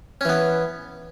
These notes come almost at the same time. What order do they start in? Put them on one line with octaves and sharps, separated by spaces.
C#4 E3 B3